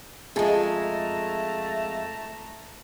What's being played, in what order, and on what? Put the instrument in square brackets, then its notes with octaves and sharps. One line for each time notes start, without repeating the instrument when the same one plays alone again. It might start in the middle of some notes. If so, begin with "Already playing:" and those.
[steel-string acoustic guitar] F2 G#3 [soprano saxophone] A3 [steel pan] G#4 A4 [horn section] E5 A5 A#5